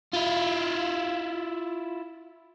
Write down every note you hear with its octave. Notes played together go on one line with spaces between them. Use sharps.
E4 F4